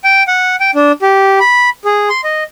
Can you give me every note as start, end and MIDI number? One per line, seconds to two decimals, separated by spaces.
0.04 0.23 79
0.27 0.56 78
0.60 0.71 79
0.75 0.92 62
1.02 1.39 67
1.40 1.70 83
1.85 2.09 68
2.09 2.21 84
2.24 2.44 75